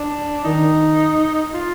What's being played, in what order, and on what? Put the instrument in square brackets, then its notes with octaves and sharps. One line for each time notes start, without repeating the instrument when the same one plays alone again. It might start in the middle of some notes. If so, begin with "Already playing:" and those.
Already playing: [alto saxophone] D4
[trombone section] D#3 [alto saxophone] D#4
[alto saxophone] F4